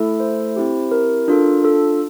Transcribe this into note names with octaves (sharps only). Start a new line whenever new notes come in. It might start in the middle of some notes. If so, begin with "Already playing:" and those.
Already playing: A3 E4 A4
C5
C4 E4 G4
A#4
D4 F4 A4
A4